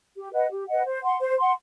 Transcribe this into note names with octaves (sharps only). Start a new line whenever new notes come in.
G4
B4 D#5 F#5
G4
B4 D#5 F#5
C5
F#5 C6
C5
F#5 C6